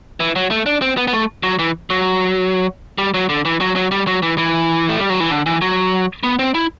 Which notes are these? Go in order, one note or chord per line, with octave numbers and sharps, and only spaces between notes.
E3
F#3
A3
D4
C4
B3
B3
A3
F#3
E3
F#3
G3
F#3
D3
E3
F#3
F#3
G3
F#3
E3
E3
A3
G3
F#3
E3
D3
E3
F#3
B3
C4
E4